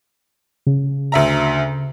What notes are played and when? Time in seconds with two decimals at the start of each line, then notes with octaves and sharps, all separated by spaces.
0.67 C#3
1.12 D2 E5 A#5